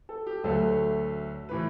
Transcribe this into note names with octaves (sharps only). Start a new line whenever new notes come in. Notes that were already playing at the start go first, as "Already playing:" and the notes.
A4
G4
D2 D3 F#3 A3 A4
A2 E3 B4